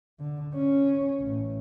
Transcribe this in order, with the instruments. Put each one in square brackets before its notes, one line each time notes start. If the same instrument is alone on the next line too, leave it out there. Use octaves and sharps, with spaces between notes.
[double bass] D3
C#4
A1